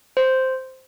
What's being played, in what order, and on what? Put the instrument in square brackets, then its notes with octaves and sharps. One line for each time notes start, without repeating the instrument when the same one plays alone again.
[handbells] C5